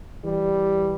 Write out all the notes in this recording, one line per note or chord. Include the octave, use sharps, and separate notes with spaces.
E3 G3